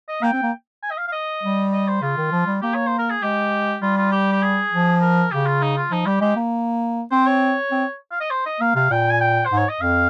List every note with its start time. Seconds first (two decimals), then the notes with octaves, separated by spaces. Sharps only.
0.08 D#5
0.22 A#3 G5
0.33 C4
0.43 A#3
0.83 G#5
0.91 D#5
0.97 F5
1.08 F5
1.12 D#5
1.43 G3
1.73 D#5
1.88 C5
2.02 C#3 F4
2.17 D#3
2.32 F3
2.47 G3
2.62 A#3 G4
2.74 C#5
2.87 C5
2.98 A#4
3.10 G#4
3.21 G#3 G4
3.82 G3 F4
3.97 F4
4.12 G4
4.32 G4
4.42 G#4
4.72 F3
5.02 A#4
5.31 C#3 G4
5.46 F4
5.62 D#4
5.77 F4
5.91 F3 D#4
6.06 G3 G4
6.21 G#3 G4
6.36 A#3
7.11 C4 C5
7.27 C#5
7.72 C4
8.11 F5
8.21 D#5
8.31 C5
8.46 D#5
8.60 A#3 F5
8.75 C3 F5
8.90 A#2 G5
9.10 G#5
9.21 G5
9.46 C5
9.51 G#2
9.57 C#5
9.69 D#5
9.81 F2 F5